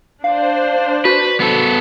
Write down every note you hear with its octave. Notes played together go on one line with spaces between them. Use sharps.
D4 C5 F5
F#4 B4
B3 A4